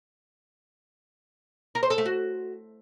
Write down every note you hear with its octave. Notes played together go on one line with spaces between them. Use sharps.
A#4
C5
A4
A3
F#4